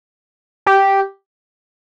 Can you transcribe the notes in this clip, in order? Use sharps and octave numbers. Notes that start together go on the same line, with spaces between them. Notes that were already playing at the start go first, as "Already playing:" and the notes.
G4